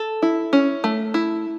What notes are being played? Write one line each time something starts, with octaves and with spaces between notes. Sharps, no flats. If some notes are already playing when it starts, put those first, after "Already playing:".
Already playing: A4
E4
C#4
A3
E4